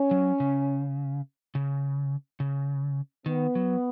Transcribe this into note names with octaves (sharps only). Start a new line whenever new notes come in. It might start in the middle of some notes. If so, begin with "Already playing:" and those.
Already playing: C#4
F#3
C#3
C#3
C#3
D#3 B3
F#3